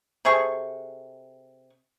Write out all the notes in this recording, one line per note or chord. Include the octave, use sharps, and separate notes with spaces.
C3 G#4 A4 C#6